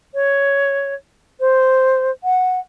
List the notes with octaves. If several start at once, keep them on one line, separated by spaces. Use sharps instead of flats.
C#5
C5
F#5